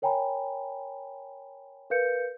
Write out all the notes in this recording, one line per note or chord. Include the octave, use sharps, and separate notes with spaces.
A#4 C#5 G5 G#5 A#5 B5
A#4 B4 F5 G6 C#7